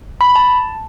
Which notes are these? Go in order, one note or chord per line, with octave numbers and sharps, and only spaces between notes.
B5
A5